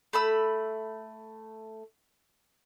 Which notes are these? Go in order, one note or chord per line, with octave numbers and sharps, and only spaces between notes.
A3 B5 E6